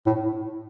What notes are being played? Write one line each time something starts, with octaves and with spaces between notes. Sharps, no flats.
A2